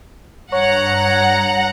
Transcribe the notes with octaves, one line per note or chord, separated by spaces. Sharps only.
G2 C#5 F#5 A#5